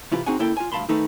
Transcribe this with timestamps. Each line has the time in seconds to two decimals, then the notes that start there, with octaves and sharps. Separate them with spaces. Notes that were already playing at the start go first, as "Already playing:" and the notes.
0.12 C3 E3 F4 G4 B4
0.26 C4 D#4 F#4 G#4 F#5 G#5
0.39 C#2 A#3 E4 A4 G5
0.57 F4 G#5
0.72 D2 G2 F5 A5 B5 C6
0.89 D#3 A3 D#4 A4 B4